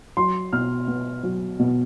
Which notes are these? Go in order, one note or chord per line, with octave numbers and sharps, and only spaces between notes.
F#3 C6
B2 F6
B3
F#3
B2